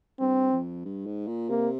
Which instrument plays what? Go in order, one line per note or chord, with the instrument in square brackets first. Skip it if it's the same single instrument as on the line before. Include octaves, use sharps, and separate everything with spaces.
[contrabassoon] G2 [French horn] C4
[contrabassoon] F2
G2
G#2
A#2
[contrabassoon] C3 [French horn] A#3